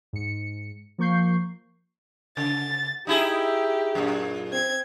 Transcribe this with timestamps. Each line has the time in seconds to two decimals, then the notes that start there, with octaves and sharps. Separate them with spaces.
0.13 G#2 C#7
0.98 F3 A#3 C#6 G6 C7
2.37 C#3 A6
3.07 D#4 E4 G4 G#4
3.95 F#2 A#2
4.51 C4 G#6